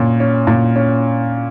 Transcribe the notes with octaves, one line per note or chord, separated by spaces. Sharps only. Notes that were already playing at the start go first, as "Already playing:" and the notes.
Already playing: A#2 C#4
C#4
A#2
C#4